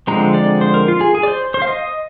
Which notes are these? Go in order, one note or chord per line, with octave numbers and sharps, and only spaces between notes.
D3 F3 G#3 C4 A#5
D5
C5
A#4
F4
G#4
G#4
D5
C5
C5
F5
D#5